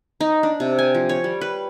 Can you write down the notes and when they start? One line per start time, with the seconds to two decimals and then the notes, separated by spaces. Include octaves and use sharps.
0.20 D#4
0.43 D4
0.60 C3
0.79 G#5
0.95 F3
1.09 C#5
1.24 G3
1.41 B4